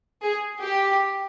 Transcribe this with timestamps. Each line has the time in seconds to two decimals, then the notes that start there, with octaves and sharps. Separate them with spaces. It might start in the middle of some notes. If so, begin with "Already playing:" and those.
0.23 G#4
0.61 G4